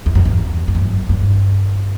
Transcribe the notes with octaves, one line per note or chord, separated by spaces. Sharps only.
E2
F#2
E2
G2
F#2
G2